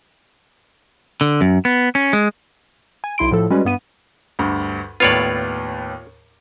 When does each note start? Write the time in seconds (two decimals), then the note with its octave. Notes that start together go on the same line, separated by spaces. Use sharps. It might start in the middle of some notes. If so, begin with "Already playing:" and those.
1.21 D3
1.41 F#2
1.65 B3
1.95 C#4
2.13 G#3
3.04 G#5
3.18 B1 E4 C6 D7
3.31 A2 F3 A4
3.50 G3 G#3 C#4 F#4 B4
3.65 G2 B3 D#7
4.39 D2 G2
5.00 D#2 A2 B3 F4 C#5 D5